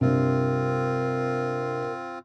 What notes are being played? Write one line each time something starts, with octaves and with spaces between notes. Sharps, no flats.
G2 C3 C4 F4 A#4